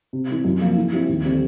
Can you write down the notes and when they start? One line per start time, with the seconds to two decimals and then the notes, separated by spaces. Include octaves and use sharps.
0.13 C3
0.29 E3 G3 C4
0.45 F#2
0.61 C#3 F3 A#3
0.77 E3
0.92 G3 C4 E4 G#4
1.09 D#2
1.24 D3 G3 C4